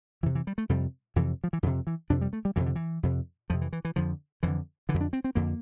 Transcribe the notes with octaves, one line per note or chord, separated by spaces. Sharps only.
F2 C3 E3
E3
G3
A3
F2 C3 G3
F2 C3 E3
F3
E3
F2 C3 D3
E3
F2 C3 D4
G3
A3
G3
F2 C3 E3
D3
E3
F2 C3
F2 C3 F3
E3
E3
E3
F2 D3 F3
F2 D3 E3
D3 E3
F2
D4
C4
C4
F2 D3 A#3